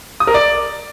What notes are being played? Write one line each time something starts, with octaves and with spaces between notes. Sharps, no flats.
D#6
A#4
D5